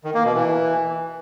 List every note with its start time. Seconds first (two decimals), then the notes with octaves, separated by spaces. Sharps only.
0.04 D#3
0.14 A#3
0.25 B2
0.35 E3